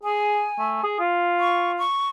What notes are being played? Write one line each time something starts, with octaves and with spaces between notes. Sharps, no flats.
G#4 G#5
A3
G#4
F4
C#6
C#6